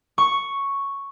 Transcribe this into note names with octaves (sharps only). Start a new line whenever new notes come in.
C#6